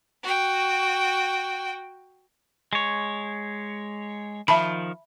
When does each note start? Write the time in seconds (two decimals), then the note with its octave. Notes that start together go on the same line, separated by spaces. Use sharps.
0.23 F#4 G5
2.73 G#3 C#5
4.48 D#3 F3 E5 A5 B5